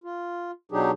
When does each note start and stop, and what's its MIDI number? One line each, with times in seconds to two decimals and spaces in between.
0.04 0.51 65
0.72 0.91 47
0.72 0.91 54
0.72 0.91 62
0.72 0.91 63
0.72 0.91 67
0.72 0.91 68